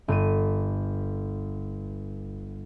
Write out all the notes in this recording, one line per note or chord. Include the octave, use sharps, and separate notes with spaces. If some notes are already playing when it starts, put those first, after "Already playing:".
G1 D#7